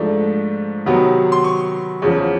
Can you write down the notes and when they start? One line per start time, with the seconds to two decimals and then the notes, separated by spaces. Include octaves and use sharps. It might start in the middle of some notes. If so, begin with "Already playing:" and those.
Already playing: G#2 F3 A3 D4
0.86 C3 D#3 F#3 B3
1.32 C6
1.44 C#6
2.02 E2 C#3 F3